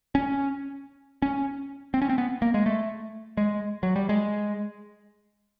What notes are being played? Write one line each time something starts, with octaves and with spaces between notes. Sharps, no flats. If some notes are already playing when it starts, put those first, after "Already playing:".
C#4
C#4
C4
C#4
C4
B3
A#3
G#3
A3
G#3
F#3
G3
G#3